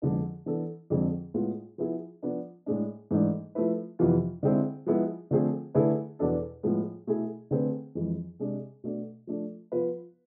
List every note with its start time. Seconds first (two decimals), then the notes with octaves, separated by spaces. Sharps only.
0.02 F2 D3 G#3 B3 D4
0.46 E3 B3 D4 A4
0.90 F2 D3 G#3 C4 G#4
1.34 A2 G#3 B3 F4
1.78 F3 B3 E4 G#4
2.23 F3 B3 D4
2.66 A2 G#3 D4
3.11 G#2 E3 A3 D4
3.55 F3 A3 E4 B4
3.99 F2 C3 E3 B3 F4
4.43 D3 G#3 C4 E4
4.86 F3 G#3 B3 E4
5.31 D3 F3 A3 C4 G#4
5.75 D3 A3 E4 G#4 B4
6.19 E2 B2 B3 D4 A4
6.63 A2 F3 G#3 B3
7.07 B2 A3 E4 G#4
7.51 D3 A3 C4 G#4 B4
7.95 F2 E3 G#3
8.39 C3 G#3 D4
8.84 B2 A3 D4
9.27 F3 A3 D4 A4
9.72 F3 B3 F4 B4